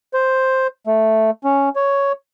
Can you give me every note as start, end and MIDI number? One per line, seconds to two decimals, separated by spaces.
0.14 0.67 72
0.87 1.31 57
1.44 1.69 61
1.76 2.12 73